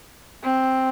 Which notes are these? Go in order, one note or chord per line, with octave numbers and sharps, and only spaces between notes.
C4